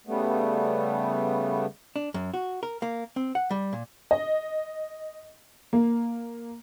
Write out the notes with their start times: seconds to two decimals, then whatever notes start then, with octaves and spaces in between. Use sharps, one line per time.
0.07 C#3 G3 A3 B3
1.96 D4
2.14 F#2
2.34 F#4
2.63 A#4
2.82 A#3
3.16 C4
3.35 F#5
3.51 G3
3.73 A#2
4.11 D#5
5.73 A#3